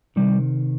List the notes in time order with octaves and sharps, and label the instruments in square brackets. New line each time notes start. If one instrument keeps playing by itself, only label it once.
[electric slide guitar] C3 D#3 G3